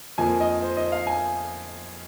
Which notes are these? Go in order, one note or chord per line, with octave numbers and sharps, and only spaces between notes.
F2 F3 A#3 G#5
D#5
C5
D#5
F5
G#5